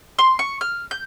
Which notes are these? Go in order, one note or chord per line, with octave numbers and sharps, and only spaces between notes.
C6
C#6
F6
G6